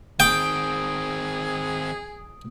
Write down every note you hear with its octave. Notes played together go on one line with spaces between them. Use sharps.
D#3 C4 G#4 G5 D#6 D7